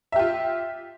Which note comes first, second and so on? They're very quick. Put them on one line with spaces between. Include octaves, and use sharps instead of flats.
E5 G4 F4